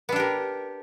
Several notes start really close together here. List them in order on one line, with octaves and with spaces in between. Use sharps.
B3 D4 G4 A#4